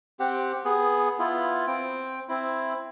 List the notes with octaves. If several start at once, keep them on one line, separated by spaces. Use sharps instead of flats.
C4 G4 F#5
B3 G#4
B3 E4 F4
C4 G5
C4 E4